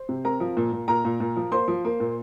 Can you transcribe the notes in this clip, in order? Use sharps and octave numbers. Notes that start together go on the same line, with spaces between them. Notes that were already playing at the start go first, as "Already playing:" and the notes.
Already playing: C5
C3
C4 A#4 A#5
F3
A#2
A#2
A#2 A#4 A#5
A#2
A#2
F3
A#3 C5 C6
F3
A#3
A#2